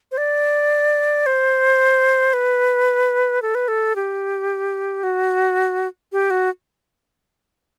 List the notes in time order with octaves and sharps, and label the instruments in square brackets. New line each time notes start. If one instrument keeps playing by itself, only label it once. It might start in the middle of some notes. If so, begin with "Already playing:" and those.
[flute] C5
D5
C5
B4
A4
B4
A4
G4
F#4
G4
F#4